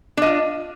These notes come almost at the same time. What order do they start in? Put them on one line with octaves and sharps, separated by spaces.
D4 D#5 F4